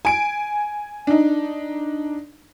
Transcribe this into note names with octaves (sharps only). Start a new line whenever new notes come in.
G#5 D7
D4 D#4